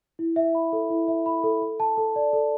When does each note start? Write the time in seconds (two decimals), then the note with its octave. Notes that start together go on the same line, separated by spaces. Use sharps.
0.19 E4
0.36 E5
0.55 B5
0.73 A4
0.90 E4
1.08 E5
1.26 B5
1.44 A4
1.62 A4
1.80 A5
1.97 A4
2.16 D5
2.33 A4